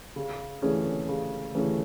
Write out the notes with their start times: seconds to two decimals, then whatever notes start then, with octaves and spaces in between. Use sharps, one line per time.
0.16 C#3
0.62 E3 A3 C#4 G#4
1.08 C#3
1.55 E3 A3 C#4 G#4